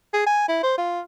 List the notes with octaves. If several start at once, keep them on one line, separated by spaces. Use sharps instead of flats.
G#4
G#5
E4
C5
F4